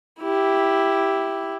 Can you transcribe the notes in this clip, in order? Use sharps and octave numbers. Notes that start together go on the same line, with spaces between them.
E4 G4